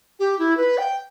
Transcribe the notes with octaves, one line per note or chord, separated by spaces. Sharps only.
G4
E4
B4
G5